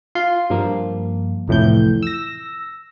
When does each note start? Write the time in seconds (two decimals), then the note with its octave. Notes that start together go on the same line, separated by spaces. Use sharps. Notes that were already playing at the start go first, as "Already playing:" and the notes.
0.15 F4 C6
0.50 G2 F3 A#3
1.48 C2 F2 A2 E3 G6
2.03 E6 A#6